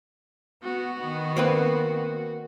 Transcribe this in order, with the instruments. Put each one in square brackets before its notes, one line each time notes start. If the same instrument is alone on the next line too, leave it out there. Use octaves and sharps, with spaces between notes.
[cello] B3 [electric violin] F#4
[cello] D#3 B3
[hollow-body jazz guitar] A#3 C4 B4